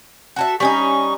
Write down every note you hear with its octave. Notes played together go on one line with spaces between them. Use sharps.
F#4 A4 E5
G3 C#4 D#4 C#6